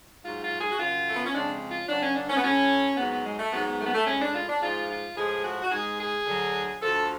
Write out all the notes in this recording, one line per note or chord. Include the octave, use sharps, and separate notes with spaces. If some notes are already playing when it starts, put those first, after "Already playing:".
G#2 F#3 F4
F4
G#4
F#4
F#2 C#3 F#3 F4
A3
B3
C#4
F2 C#3 G#3 D4
F4
F#2 C#3 F#3 D4
C#4
D4
C#4
B3
A2 F#3 C#4
G#2 F#3 B3
B3
G#3
A3
G#2 F#3 B3
B3
A3
B3
A3
A2 G#3 C#4
D4
F4
D4
G#2 F3 G#3 F4
F4
A2 F3 G#3 G#4
F#4
F#4
G#2 G#3 G#4
G#4
D2 D3 F#3
D2 D3 F3 A4